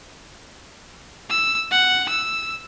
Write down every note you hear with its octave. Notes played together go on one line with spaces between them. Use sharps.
E6
F#5
E6